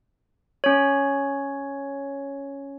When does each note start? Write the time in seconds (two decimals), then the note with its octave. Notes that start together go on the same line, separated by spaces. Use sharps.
0.64 C#4 C#5